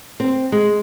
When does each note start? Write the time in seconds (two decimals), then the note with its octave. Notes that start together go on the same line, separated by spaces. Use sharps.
0.20 C4
0.52 G#3